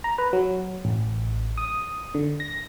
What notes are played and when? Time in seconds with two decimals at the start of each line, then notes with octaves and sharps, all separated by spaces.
0.04 A#5
0.18 B4
0.33 F#3
0.85 A1
1.57 D#6
2.14 D3
2.40 A#6